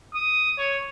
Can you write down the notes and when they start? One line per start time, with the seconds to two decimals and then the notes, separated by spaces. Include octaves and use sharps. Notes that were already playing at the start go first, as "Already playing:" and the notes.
0.14 D#6
0.58 C#5